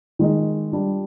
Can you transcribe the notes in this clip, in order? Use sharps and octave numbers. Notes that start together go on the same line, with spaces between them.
D#3 G#3 D#4
G3 D4 F4